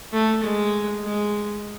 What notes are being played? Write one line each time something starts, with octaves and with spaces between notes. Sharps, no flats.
A3
G#3
G#3